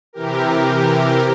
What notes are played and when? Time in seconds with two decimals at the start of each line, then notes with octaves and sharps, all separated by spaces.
0.13 C3 E3 G4 A#4